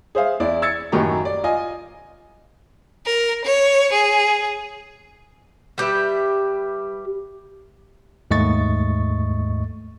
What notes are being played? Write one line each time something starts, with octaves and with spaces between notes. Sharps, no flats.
G#4 C5 E5 F5
E2 E4 D5
E6 G#6 A6 C#7
F#2 A2 D#3 F#3 G4 A#5
D5
F4 D#5 G#5
A#4
C#5
G#4
G3 G4 B4 E5
D#2 G#2 A3 D#5 C#6 A6